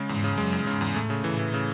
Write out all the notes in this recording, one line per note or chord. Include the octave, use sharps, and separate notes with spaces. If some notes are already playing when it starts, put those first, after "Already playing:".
Already playing: C#3 G#3
E2 G#2
C#3
F#2 G#3
E2
G#2 C#3
E2
A2 A3
C#3
A2 E3
E3
C#3